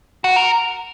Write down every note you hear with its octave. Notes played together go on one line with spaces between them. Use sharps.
F#4
A#4